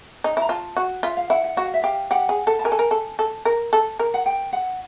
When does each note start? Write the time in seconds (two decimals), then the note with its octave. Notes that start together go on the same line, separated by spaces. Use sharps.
0.24 D#4
0.37 E4 A#5
0.49 F4 A5
0.77 F#4
1.03 F4 E5
1.17 F5
1.30 E4 F#5
1.44 F#5
1.57 F#4 F#5
1.66 F5
1.74 E5
1.82 G4 F5
2.11 G4 F#5
2.29 G#4
2.47 A4
2.59 A5
2.64 A#4 G#5
2.72 A4
2.79 A#4
2.91 A4
3.19 A4
3.45 A#4
3.73 A4
3.99 A#4
4.14 F#5
4.26 G5
4.53 F#5